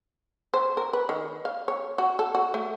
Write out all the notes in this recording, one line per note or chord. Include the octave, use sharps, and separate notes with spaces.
C5
A#4
B4
D#3
F5
C#5
F#4
A4
F#4
A3